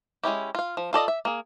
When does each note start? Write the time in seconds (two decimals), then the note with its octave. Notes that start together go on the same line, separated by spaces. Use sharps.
0.24 G#3 C#4 E4 G4
0.55 F4 F5
0.77 F3
0.93 F4 A4 D5 D#5
1.08 E5
1.25 A#3 G#4